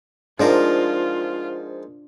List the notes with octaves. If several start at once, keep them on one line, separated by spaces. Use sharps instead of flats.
G#2 F3 D4 F4 A#4